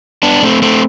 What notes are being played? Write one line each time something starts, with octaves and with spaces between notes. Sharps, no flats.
B3 D4
A3 C4
A3 C4